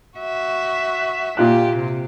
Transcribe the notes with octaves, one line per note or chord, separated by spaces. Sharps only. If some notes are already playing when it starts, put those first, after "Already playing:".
F#4 E5
A#2 F4 G4 F#6
C3